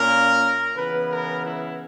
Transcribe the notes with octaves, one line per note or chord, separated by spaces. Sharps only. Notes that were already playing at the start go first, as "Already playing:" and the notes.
Already playing: A#2 A#3 C#4 A#4
C#3 E3 B3 B4
A#4
E4